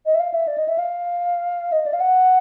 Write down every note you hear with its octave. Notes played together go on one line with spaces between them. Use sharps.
D#5
E5
F5
E5
D5
D#5
E5
F5
D#5
D5
F5
F#5